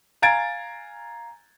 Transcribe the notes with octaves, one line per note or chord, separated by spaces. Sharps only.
F5 G#5 A#5 G#6 A6 D7